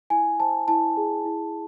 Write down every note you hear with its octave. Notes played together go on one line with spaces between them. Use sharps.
E4 G#5
C5 A5
E4 A5
G#4
E4